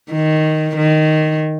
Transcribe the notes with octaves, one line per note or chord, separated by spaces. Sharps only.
D#3
D#3